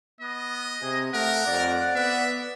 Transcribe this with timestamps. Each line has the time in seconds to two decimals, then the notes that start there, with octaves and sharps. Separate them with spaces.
0.21 B3 D#5
0.82 C3 G#4
1.14 A3 A#4 F#5
1.47 F2 D5
1.95 B3 E5